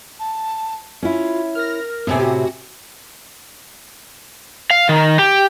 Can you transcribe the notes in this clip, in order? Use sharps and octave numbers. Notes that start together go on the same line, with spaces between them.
A5
C#4 E4 F4
A#4 F6 A#6
A2 C3 B3 C4 G#5
F#4 G4
F5
D#3
G4